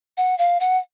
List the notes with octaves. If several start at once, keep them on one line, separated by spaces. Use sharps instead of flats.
F#5
F5
F#5